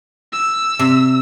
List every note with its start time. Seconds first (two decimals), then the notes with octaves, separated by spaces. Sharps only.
0.32 E6
0.79 C3